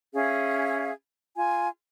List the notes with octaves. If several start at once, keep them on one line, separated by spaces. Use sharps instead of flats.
C#4 G#4 E5 F5
F4 G#5